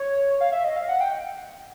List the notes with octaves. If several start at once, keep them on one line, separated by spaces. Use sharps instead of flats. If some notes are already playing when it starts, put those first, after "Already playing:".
Already playing: C#5
F5
E5
D#5
F5
F#5
G5